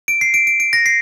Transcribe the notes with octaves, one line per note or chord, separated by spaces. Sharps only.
D7
C7
D7
D7
D7
A#6
C7